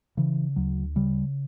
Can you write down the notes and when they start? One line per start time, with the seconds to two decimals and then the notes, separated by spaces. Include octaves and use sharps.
0.17 C#3 E3
0.56 D2 F#3
0.96 C#3 G3